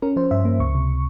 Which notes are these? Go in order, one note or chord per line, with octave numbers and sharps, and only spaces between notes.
C#4 A#4
F3 C5
G2 E5
A#3
C#2 C#6
C3